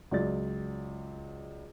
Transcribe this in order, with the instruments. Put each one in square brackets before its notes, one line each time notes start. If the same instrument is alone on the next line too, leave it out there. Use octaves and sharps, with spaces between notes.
[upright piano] C#2 F#3 D5 A6